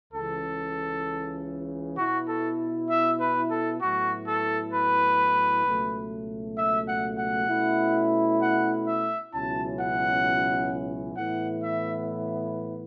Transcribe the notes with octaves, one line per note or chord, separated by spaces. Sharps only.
C#2 C#3 E3 A4
B2 B3 E4 F#4
A4
E5
B4
A4
A2 F#3 B3 E4 F#4
A4
B4
C#2 B2 F#3 A3
E5
F#5
F#5
B2 A3 C#4 E4
F#5
E5
C#2 B2 F#3 C#4 E4 A5
F#5
A2 E3 B3 E4 F#5
E5